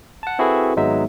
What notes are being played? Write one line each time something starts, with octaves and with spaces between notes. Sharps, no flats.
F#5 A5
C4 E4 F#4 G#4 A4 B4
G#1 F#3 G#3 B3 D#4 E5